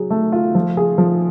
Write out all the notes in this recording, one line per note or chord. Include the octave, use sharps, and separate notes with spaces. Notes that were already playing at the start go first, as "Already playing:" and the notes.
Already playing: F#3 G#4
A3
F4
F3
G#4
F3